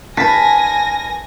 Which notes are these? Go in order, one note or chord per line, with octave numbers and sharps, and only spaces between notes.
D#3 B4 G#5 A5 A#6 B6